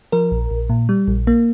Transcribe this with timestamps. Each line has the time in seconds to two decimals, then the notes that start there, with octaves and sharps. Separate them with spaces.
0.12 F3 A#4
0.32 A#1
0.51 A#1
0.70 A#2
0.89 G3
1.08 A#1
1.27 A#3